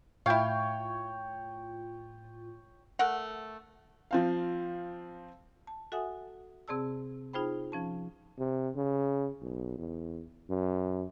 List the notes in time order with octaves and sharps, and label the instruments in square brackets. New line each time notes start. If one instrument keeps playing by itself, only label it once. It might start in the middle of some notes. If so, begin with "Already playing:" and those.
[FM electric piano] A2 F4 [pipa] E4 F5 [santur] C#5 G5
[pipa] A3 A#4 F#5
[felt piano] F3 C4 F5
[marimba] A5
F#4 A4 E5 F#5 G#5 D#6
C3 C4 G#4 D5 A5 E6
D#4 F4 G#4 C5 G5 B5
F3 C#4 A5
[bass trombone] C3
C#3
B1
E2
F#2